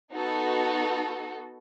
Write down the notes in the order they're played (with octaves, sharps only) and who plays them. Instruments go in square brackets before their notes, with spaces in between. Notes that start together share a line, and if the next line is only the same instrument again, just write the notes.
[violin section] B3 D#4 F#4 A4